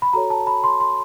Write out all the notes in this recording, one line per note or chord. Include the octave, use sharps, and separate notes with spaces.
B5
F#4 A4 C#5 A#5
A5
B5
C6
C6